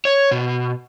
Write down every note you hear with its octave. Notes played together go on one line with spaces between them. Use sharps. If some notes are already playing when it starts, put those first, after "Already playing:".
C#5
B2